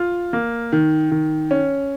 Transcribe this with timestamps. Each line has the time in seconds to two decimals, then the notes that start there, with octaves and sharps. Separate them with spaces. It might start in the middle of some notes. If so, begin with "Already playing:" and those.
Already playing: F4
0.33 A#3
0.72 D#3
1.12 D#3
1.51 C#4